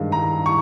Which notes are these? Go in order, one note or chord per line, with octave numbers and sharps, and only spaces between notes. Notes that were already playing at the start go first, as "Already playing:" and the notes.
Already playing: G2 D#3 G#3 F5
A#5
C#6